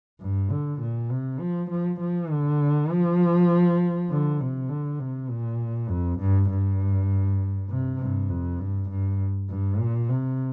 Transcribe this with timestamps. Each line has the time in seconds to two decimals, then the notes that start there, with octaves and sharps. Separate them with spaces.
0.20 G2
0.51 D3
0.81 A#2
1.11 C3
1.40 F3
1.70 F3
2.00 F3
2.31 D3
2.90 F3
4.10 D3
4.40 C3
4.69 D3
4.99 C3
5.30 A#2
5.89 F2
6.20 G2
6.50 G2
7.69 C3
8.00 G2
8.29 F2
8.59 G2
8.90 G2
9.49 G2
9.79 A#2
10.09 C3